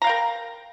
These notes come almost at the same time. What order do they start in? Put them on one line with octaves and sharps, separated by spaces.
A#5 F5 G5 A#4